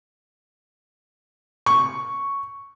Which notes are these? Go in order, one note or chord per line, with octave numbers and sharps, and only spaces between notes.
C#6